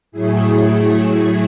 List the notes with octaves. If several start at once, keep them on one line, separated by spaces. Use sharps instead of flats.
A2 F#3 A3 E4 G#4